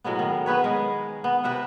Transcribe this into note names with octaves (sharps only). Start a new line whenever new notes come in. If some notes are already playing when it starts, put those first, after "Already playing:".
A2 F#3 G#3 B3
D#3
B3 G#4 B4 C#5
G#3 A#4
B3
C3 B4 E5 F#5